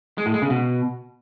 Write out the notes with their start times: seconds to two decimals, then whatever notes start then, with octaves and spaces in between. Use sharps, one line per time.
0.18 G#3
0.26 A2
0.34 G#3
0.42 C#3
0.50 B2